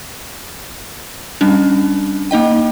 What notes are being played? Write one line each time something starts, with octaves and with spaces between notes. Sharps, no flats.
G3 C#4 D4
A#3 D#4 D#5 G5